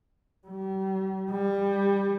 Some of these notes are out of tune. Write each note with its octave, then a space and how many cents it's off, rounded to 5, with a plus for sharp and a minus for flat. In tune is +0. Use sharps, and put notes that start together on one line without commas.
G3 -35
G3 +20